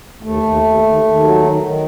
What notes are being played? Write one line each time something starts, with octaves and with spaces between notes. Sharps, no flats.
D#2 A3
D#2
D#2
D#2
D#2
F#3
D#3
D#3